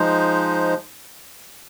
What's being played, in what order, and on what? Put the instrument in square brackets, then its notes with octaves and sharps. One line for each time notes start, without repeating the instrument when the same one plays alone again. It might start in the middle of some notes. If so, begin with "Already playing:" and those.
Already playing: [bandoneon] F3 G#3 D#4 C5